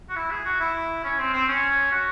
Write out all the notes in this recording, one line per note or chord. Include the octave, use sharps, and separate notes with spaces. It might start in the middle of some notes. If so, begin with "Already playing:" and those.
F#4
E4
G#4
F#4
E4
C#4
C4
C4
C#4
F#4